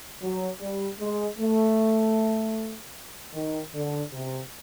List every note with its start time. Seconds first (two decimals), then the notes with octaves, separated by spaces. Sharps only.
0.22 F#3
0.61 G3
0.99 G#3
1.39 A3
3.34 D#3
3.74 D3
4.13 C3